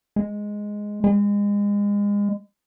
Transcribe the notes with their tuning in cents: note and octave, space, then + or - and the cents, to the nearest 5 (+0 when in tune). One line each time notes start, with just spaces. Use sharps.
G#3 +0
G#3 -30